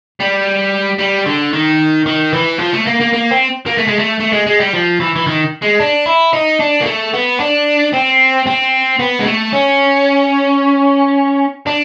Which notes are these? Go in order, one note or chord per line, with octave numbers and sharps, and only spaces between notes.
G3
G3
D3
D#3
D#3
E3
F3
A3
A#3
A#3
A#3
C4
A#3
A3
G#3
A3
A3
G#3
G#3
G3
F3
E3
E3
D#3
G#3
D4
E4
D#4
D4
A#3
A3
B3
D4
C4
C4
B3
G#3
A3
C#4
D4